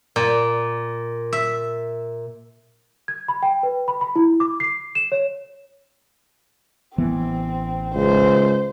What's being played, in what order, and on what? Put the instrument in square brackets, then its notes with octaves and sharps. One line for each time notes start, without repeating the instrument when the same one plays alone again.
[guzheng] A#2
E5
[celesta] G#6
B5
G5
B4
B5
B5
E4
D6
C7
E7
C#5
[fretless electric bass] A1 E3 B3 [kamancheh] C4
[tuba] C#2 [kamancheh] C5